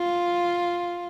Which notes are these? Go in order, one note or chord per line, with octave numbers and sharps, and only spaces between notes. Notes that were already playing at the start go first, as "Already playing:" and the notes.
Already playing: F4